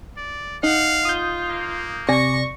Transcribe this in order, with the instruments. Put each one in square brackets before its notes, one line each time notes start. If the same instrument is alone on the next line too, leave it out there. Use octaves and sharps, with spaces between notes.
[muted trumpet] D5
[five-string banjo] D#4 [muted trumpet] F5 [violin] F#5
[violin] F4 [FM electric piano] D#6 G6
[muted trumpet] A#3
[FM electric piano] C3 D5 A#6 [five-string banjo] G#5 [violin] C#6